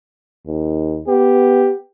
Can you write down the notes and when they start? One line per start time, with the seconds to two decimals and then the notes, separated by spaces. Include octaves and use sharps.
0.46 D#2
1.08 B3 G4